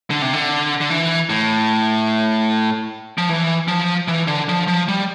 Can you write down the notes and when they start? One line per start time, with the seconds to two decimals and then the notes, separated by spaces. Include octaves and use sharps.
0.11 D3
0.22 C3
0.33 D3
0.81 D3
0.90 E3
1.30 A2
3.18 F3
3.29 E3
3.68 F3
4.08 E3
4.28 D3
4.49 F3
4.68 F3
4.88 G3